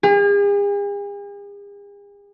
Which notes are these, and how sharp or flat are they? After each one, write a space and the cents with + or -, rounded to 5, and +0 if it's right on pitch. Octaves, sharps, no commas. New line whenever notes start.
G#4 -45